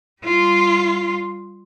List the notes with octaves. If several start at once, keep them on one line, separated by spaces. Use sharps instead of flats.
G3 F4